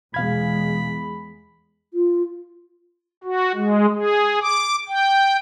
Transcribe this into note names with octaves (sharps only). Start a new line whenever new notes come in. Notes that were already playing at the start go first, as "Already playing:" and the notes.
E2 B2 G#3 F5 B5 G#6
F4
F#4
G#3
G#4
D6
G5